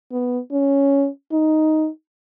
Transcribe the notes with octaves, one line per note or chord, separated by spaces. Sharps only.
B3
C#4
D#4